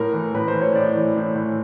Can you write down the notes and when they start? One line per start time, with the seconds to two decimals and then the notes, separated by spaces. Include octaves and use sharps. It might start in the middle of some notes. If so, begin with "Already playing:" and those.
Already playing: A2 A#4
0.14 E3
0.34 A2 B4
0.48 C5
0.55 E3
0.61 C#5
0.75 A2 D5
0.95 E3
1.16 A2
1.36 E3